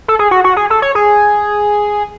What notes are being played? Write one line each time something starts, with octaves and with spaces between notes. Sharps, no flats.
A4
G#4
F#4
F#4
G#4
A4
C#5
G#4